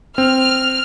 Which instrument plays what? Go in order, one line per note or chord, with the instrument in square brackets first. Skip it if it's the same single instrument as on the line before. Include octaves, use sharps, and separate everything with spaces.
[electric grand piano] C4 [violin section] F6